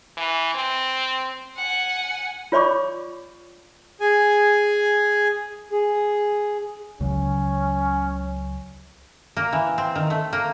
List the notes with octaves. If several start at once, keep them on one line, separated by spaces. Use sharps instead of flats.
E3
C4
F#5 G#5
F4 C#5 D5 B5 C#6 D6
G#4 G#5
G#4
C#2 C#3 F#3 C#4
A#3
E3
C4
D#3
A3
A#3